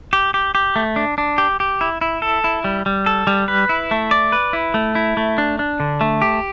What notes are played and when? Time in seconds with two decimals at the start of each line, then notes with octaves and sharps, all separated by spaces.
0.13 G4
0.34 G4
0.55 G4
0.76 A3
0.96 D4
1.18 D4
1.38 G4
1.60 G4
1.81 E4
2.01 E4
2.22 A4
2.44 E4
2.64 G3
2.86 G3
3.06 A4
3.27 G3
3.48 B4
3.69 E4
3.91 A3
4.11 D5
4.32 B4
4.53 E4
4.74 A3
4.95 E4
5.17 A3
5.38 D4
5.59 D4
5.80 D3
6.01 A3
6.22 G4